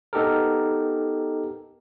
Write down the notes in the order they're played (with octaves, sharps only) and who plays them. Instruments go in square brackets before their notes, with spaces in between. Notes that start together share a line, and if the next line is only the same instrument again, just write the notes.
[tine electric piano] B3 D#4 G4 A4 A#4